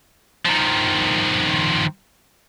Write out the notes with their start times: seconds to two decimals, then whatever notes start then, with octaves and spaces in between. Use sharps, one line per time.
0.46 D#3 F3